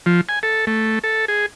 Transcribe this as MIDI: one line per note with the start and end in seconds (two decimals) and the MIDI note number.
0.06 0.21 53
0.29 0.39 80
0.43 0.65 69
0.67 0.99 57
1.04 1.25 69
1.28 1.46 68